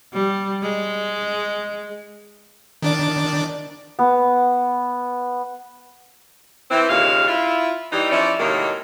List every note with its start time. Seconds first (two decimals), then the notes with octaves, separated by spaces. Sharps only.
0.13 G3
0.62 G#3
2.82 D#3 D4 D5
3.99 B3
6.71 E3 C4
6.89 D#2 A#2 C#3 G#3 F5
7.27 E4 F4
7.92 E3 G3 D#4
8.11 F3 C#4 E4 D5
8.39 A2 C3 D#3 F#3 G#3 A#3